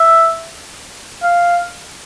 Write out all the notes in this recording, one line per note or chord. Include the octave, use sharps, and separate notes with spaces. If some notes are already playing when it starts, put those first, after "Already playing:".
Already playing: E5
F5